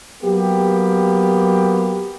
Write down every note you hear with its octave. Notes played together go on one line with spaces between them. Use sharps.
F#3 A#3 B3 G4